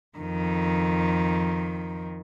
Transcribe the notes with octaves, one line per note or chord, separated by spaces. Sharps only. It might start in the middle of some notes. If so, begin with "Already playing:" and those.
F2 D#3